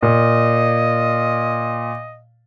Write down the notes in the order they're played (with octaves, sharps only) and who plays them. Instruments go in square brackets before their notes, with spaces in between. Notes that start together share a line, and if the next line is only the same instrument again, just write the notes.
[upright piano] A#2 [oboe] D#5